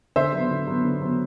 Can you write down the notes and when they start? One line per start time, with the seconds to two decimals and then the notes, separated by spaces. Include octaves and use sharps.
0.16 D3 C5 E5
0.32 F#3 B3
0.51 D3
0.67 F#3 B3
0.84 D3
1.01 F#3 B3